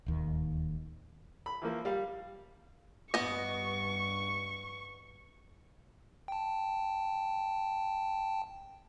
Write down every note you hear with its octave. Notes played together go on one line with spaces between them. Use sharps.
D1 D#2 D#3
B5
E3 F3 A#3
G3 F5
G2 B3 D#5 C#6
G5 A5